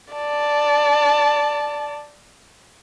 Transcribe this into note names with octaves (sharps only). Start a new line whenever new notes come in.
D5 A5